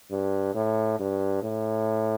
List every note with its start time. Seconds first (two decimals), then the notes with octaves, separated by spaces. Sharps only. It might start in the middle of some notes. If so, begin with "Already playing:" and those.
0.11 G2
0.55 A2
0.99 G2
1.43 A2